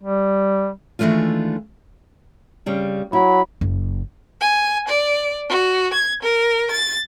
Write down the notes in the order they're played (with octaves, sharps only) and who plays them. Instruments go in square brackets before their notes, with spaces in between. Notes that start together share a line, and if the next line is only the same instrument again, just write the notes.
[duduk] G3
[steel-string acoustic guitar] D#3 E3 G#3 A3 D4 F4
[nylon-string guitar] C#3 G3 C4
[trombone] F#3 [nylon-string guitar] E4 [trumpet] B5
[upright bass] F#1
[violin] G#5
D5
F#4
G#6
A#4
A6